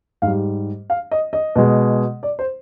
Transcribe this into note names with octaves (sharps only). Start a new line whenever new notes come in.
G#2 G3 F5
F5
D#5
D#5
B2 G#3
D5
C5